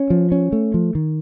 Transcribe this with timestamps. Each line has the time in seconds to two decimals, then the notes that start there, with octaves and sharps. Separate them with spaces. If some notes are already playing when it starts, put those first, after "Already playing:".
Already playing: C#4
0.10 F3
0.32 C#4
0.52 A3
0.74 F3
0.95 D#3